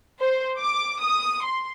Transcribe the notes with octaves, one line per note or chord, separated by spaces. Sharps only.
C5
D6
D#6
C6